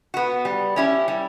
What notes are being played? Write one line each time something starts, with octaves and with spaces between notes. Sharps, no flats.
B3 F#4
G3
C#4 E4 G4
G3